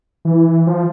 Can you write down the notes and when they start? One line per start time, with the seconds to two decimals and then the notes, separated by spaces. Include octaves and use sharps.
0.25 E3
0.67 F3